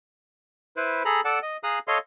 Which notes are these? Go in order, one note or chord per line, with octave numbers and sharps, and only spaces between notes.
E4 B4 C5
G#4 A4 A#5 B5
A4 D5 F#5 A5
D#5
G#4 F5 A#5 D#6 F#6
A4 C#5 D#5 F5 C6